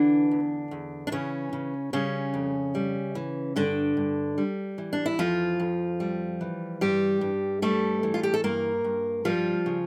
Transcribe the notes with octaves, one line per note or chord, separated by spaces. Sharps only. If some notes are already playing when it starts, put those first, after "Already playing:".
Already playing: D3 E3 D4
E2
E2
D4
C#3 E3 C#4
C#3
C#3 G3 C#4
F2
G3
E3
G2 D3 D4
G2
G3
E3
D4
E4
F2 F3 F4
F2
G3
E3
G2 G3 G4
G2
G3 A3 A4
E3
F4
G4
A4
G2 A#3 A#4
G2
F3 G3 F4
C#3